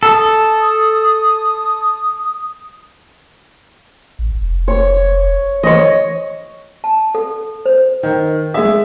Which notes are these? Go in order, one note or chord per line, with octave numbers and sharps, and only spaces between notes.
A4 D#6
A1
F1
C#5
E3 C#5 D#5
A5
A4
C5
D#3
G#3 E5 D#6